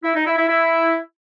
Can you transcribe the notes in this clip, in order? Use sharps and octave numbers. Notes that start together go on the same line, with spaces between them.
E4
D#4
E4
E4
E4